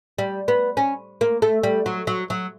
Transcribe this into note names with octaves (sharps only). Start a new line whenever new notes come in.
G3
B3
C#4
A#3
A3
G3
F#3
F#3
F#3